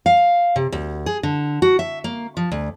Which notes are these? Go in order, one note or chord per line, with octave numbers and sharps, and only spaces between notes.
F5
C3
D2
G#4
D3
F#4
E5
A#3
F3
D2